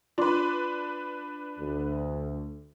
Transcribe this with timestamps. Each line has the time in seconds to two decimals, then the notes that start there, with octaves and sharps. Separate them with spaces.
0.18 D4 F4 B4 C6 D6
1.58 D2